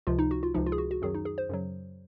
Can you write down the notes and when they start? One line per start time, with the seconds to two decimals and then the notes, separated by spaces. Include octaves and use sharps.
0.07 C#2 C3 F3 F4
0.19 D#4
0.31 F#4
0.43 F4
0.54 C#2 C3 F3 D#4
0.66 F4
0.72 G#4
0.78 F#4
0.91 F#4
1.02 F#2 D#3 F#3 G#4
1.14 D#4
1.25 G#4
1.38 C5
1.49 F#2 C#3 F#3